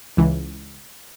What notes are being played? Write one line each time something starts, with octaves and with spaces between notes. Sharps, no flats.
C#2 E3